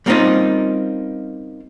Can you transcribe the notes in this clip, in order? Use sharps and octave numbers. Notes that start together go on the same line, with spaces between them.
G3 A#3 C4 C#4 D#4 F4